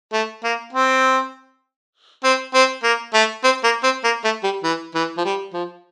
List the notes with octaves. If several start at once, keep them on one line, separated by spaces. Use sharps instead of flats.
A3
A#3
C4
C4
C4
A#3
A3
C4
A#3
C4
A#3
A3
G3
E3
E3
F3
G3
F3